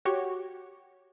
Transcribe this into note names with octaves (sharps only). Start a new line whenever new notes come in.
F#4 G4 C#5